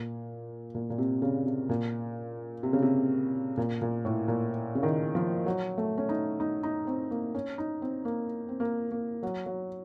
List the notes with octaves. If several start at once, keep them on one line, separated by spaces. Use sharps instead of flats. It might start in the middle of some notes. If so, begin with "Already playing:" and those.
Already playing: A#2
A#2
A#2
C3
C#3
C3
A#2
C3
C#3
C3
A#2
A#2
A2
A#2
C#3
D#3
F3
F#3
A3
C#4
D#4
D#4
D#4
C4
A#3
C#4
D#4
C4
A#3
C4
A#3
A#3
F#3
F#3